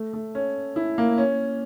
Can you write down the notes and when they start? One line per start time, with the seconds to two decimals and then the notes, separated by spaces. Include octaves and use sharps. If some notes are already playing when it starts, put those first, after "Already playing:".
Already playing: A3
0.13 A3
0.35 C#4
0.76 E4
0.98 A#3
1.18 C#4